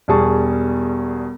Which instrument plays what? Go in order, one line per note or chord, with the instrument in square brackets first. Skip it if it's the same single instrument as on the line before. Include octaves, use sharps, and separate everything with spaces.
[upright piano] E1 E2 G3 G#4 A5 C#6